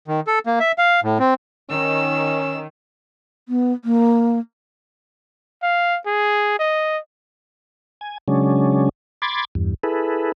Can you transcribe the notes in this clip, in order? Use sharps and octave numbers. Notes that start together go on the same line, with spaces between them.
D#3
A4
A#3
E5
F5
A2
C4
D#3 C#4 E6
B3
A#3
F5
G#4
D#5
G#5
C#3 F#3 G#3 C#4 D4
B5 C6 D6 G#6 A6
E2 G2
E4 G#4 A4 B4